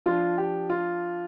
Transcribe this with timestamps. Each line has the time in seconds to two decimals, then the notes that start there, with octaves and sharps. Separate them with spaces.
0.06 F3 D4 F4
0.38 G4
0.70 F4